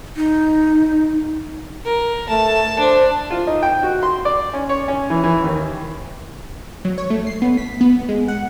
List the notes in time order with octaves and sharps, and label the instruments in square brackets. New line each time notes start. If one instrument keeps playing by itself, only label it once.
[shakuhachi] D#4
[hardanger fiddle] A#4
[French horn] A3 [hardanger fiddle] A5
[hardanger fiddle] D4 [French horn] C5
[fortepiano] F4
D#4
G5
F#4
C6
D5
C#4
C#5
C#4
E3
E3
D#2
[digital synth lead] F#3
C#5
A3
C7
B3
B6
B3
G#3
F#5